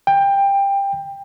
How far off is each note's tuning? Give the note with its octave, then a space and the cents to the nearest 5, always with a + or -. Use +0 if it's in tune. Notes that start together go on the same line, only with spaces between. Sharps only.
G5 +20